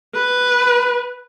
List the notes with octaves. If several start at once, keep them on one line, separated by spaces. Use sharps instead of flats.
B4